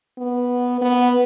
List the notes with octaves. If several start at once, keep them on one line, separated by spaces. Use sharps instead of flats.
B3
B3